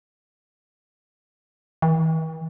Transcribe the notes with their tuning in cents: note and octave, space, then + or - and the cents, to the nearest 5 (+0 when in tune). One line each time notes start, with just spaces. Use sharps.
E3 -45